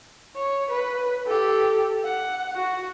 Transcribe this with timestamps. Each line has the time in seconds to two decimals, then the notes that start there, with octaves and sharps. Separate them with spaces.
0.36 C#5
0.71 B4
1.27 G4 A4
2.05 F#5
2.56 F#4